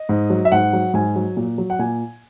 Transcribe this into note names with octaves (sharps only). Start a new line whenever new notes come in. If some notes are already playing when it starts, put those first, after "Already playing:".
Already playing: D#5
G#2
F#3
E5
G#2 F#5
F#3
G#2 G#5
F#3
A#2
F#3
F#5
A#2 G#5